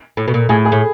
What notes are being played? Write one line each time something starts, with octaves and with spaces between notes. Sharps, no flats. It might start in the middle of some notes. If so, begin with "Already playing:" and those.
A2
B2
A#2
A2 G#4
G#4
A2